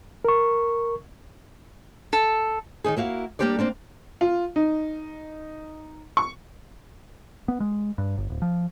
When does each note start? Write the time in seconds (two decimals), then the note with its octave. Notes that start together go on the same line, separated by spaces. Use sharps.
0.25 A#4 C#6
2.13 A4
2.84 D#3 E3 D#4 G#4
2.97 A#3 E4 F#4 F5
3.39 G3 A#3 D4 G4 C5 D5
3.59 A#3 C4 D4
4.21 F4
4.56 D#4
6.17 C#6
7.48 B3
7.60 G#3
7.98 G2
8.17 G1
8.30 D1
8.42 F3